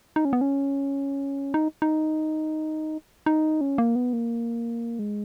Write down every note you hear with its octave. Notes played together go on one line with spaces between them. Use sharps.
D#4
C#4
B3
C#4
D#4
D#4
D#4
C#4
A#3
B3
A#3
G#3